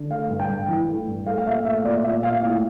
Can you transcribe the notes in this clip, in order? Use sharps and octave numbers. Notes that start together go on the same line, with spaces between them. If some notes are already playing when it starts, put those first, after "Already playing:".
Already playing: D3
A3 F5
G2
G5
G2
E3
A3
G2
A3 F5
F5
A#2 E5
A3 E5
A#2 D5
A#2 E5
A#2 F5
A2 F5